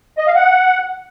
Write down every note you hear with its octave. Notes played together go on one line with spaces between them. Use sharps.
D#5
F5
F#5